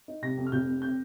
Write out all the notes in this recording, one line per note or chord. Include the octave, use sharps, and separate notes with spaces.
D#4
C3 A#6
F2
F6
F1 G6
F2
C4 G6